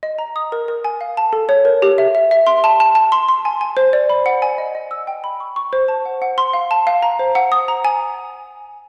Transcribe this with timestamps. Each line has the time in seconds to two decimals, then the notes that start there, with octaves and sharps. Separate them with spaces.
0.03 D#5
0.19 A#5
0.36 D#6
0.52 A#4
0.68 A#4
0.85 G#5
1.01 F5
1.17 A5
1.33 A4
1.49 C#5
1.65 A#4
1.82 G4
1.98 E5
2.15 E5
2.31 E5
2.47 C6
2.64 A5
2.80 A5
2.95 A5
3.12 C6
3.29 C6
3.45 G#5
3.61 G#5
3.77 C5
3.93 D5
4.10 B5
4.26 F#5
4.42 G#5
4.58 D#5
4.75 D#5
4.91 E6
5.07 G5
5.24 B5
5.40 C#6
5.56 C#6
5.73 C5
5.88 A5
6.05 F#5
6.22 F#5
6.38 C6
6.53 F5
6.71 A5
6.87 F5
7.03 A#5
7.19 C5
7.35 F#5
7.52 D#6
7.68 A#5
7.85 G#5